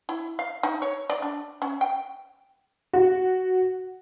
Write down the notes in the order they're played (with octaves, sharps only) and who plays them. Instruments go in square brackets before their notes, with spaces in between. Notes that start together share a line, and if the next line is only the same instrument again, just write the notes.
[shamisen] E4
F5
D#4
C#5
D5
D4
C#4
G5
[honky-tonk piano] F#4